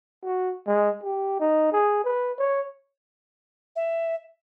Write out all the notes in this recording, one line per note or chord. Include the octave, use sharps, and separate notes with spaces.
F#4
G#3
G4
D#4
G#4
B4
C#5
E5